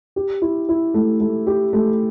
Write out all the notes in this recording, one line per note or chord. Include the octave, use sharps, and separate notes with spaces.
G4
E4
E4
A3
A3
G4
A3